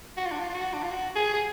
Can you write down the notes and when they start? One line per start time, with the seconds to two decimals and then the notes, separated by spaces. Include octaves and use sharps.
0.17 F#4
0.25 F4
0.31 D4
0.39 F4
0.50 F4
0.54 F#4
0.73 D4
0.83 F4
0.91 F#4
1.15 G#4
1.34 G#4